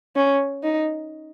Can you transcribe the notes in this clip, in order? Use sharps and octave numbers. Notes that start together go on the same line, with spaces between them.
C#4
D#4